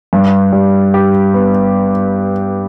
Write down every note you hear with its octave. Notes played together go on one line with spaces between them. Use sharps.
G2
G3
G4
B3